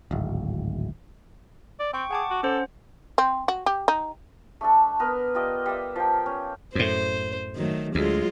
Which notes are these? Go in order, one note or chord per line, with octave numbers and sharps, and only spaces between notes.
D1 G#1
D5
C4 G5 C#6
G#4 F#5 A5 D6
F#4
C#4 A4 C5 F#5
C4
F#4
G4
D#4
A3 D4 A4
B3 A#4 B4
F4 G4 D5 D#5
G3 E5
F3 G5
C#4
F#2 A2 C5
D#3 F#3 A3
D2 F#3 G#3 F4